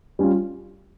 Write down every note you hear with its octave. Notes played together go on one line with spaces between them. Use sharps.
G3 C#4 F4